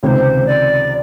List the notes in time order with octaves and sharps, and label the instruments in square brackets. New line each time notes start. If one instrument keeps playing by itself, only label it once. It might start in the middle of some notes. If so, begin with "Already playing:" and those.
[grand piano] C#2 C3 D#3 [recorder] C5 C#5
[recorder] D5